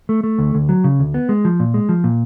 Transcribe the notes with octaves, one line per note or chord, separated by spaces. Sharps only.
A3
A3
D2
D2
F#3
C#3
D2
B3
G#3
F3
A#2
G#3
F3
A#2